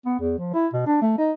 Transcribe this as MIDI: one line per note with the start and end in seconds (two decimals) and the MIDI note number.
0.06 0.15 59
0.19 0.34 40
0.38 0.49 53
0.54 0.67 64
0.73 0.84 47
0.87 1.00 62
1.02 1.13 57
1.18 1.32 63